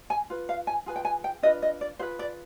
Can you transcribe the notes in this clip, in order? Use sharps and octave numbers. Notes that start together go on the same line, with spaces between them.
G#5
F4 B4
F5
G#5
F4 G#4 B4 G#5
G5
G#5
G5
D4 F4 B4 D#5
D#5
D5
F4 G#4 B4 C5
D5